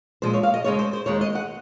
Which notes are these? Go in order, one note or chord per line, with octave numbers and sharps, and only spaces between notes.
A#2 F3 G#3 C5
C#5
F5
D#5
D#2 C#3 G#3 C#5
C5
C5
D#2 D#3 G#3 C#5
D#5
F#5